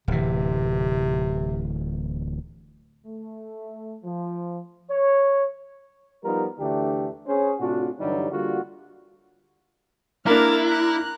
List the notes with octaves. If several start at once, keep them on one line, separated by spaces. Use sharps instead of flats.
D1 C3 E3
A3
F3
C#5
F3 G3 B3 D#4 F4 A#4
D2 D3 E3 A3 D4 G4
C#4 G#4 C5
A2 C3 D4 F4 F#4
G2 D3 E3 F#3 G3 D#4
D3 G3 A#3 F4 F#4
A#3 D4 E4 A#4 F6 A6
A#5 F#6